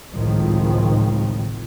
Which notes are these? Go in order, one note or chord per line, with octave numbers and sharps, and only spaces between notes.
G#1 C#2 A2 D#3 F3